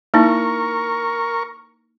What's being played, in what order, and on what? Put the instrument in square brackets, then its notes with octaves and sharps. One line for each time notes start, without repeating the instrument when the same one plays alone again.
[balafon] A#3 D#4 E4 [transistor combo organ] A#4 C#6